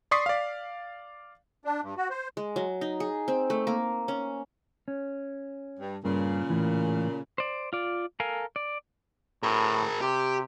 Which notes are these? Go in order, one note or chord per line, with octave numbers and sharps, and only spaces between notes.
D5 C6 C#6 D#6 B6 C7
D5 F5
D4
G2
F#4
C5
G#3
F#3
D#4
G#4
C4
A3
A#3
C#4
C#4
G2
G2 A#2 C#3
A2 E3
C5 D5
F4 D5
A4 A#4 F5 G#5
D5
A2 G#4 A#4
C3 G4